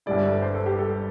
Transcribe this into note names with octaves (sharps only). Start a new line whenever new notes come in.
G1 G2 G3 E4 D5
A4
C5
A4
G4
A4